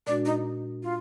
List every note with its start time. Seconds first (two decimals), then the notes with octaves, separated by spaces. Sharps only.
0.07 A#2 G#3 D4 F#4 D5
0.25 D#4
0.83 F4